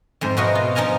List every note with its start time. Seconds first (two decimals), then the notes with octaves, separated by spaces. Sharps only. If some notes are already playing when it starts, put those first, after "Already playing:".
0.21 F2 G#2 C5
0.37 B2 E4 F#4 A#4 D#5 F5
0.55 F4
0.75 G2 F3 D#4 A#4 G#5 A#5